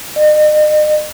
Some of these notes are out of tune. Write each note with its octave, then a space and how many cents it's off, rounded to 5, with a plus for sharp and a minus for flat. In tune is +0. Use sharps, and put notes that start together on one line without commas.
D#5 -40